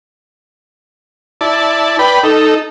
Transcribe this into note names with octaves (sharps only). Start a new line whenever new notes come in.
E4 D5 A5
B4 D5 G5 B5
D#4 A4